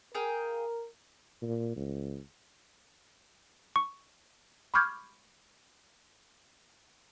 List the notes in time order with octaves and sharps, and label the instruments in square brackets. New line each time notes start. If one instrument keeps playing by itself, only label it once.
[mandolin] G#4 F5 G5 [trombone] A#4
[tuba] A#2
C#2
[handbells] C#6
[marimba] B5 C#6 D6 F6 G6 G#6